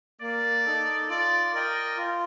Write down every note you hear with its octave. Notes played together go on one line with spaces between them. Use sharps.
A#3 D5
D#4 A4
F4 D5
A#4 D5 D#5 G5
F4